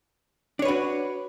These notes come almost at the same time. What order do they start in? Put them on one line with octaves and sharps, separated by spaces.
D4 C#5 B4 F#4